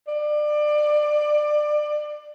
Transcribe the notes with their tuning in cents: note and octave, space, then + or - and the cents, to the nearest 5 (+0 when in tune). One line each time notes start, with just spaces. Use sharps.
D5 +25